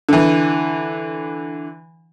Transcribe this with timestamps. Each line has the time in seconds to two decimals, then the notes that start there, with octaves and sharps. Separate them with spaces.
0.09 D3 E3